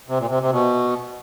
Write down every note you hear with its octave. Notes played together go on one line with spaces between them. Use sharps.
C3
A#2
C3
C3
B2